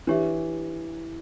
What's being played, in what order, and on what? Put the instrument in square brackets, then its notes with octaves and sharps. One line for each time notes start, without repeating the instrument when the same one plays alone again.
[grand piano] E3 [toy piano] D4 G4 C#5 E5